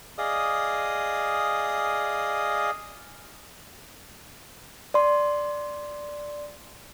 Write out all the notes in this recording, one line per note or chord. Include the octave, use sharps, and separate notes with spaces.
G#4 D5 D#5 F5 D#6
D5 C6